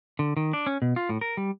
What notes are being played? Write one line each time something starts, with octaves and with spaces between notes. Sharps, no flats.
D3
D#3
D4
C#4
B2
F4
A2
A#4
G3